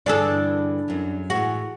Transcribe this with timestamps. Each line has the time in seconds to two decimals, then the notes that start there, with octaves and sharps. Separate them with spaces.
0.06 G2 D3 E3 D4 G#4 A4
0.88 F#2 F#3
1.30 A2 E3 F#4 G#4